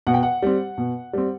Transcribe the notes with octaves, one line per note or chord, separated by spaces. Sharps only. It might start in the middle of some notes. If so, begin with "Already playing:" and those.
B2 F#5
G5
F#5
G3 C4
B2
G3 C4